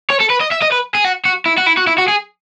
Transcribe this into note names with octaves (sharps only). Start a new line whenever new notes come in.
C#5
A4
B4
D#5
E5
D#5
B4
G#4
F#4
F#4
E4
F#4
E4
F#4
E4
F#4
G#4